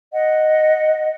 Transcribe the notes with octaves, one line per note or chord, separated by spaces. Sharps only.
D#5 F#5